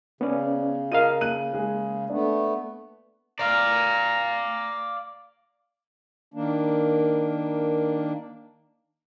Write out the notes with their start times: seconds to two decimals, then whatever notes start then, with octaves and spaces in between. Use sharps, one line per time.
0.21 C#3 B3 C#4 D5
0.92 F4 A#4 D#5 F5 D#7
1.21 A#3 F#6 D#7
1.53 G#3 G#4
2.10 A3 B3 D4
3.39 D5 F5 A#5
6.34 D#3 A#3 D4